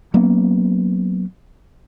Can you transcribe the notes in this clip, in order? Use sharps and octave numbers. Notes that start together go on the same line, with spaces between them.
F#3 A#3 B3 C#4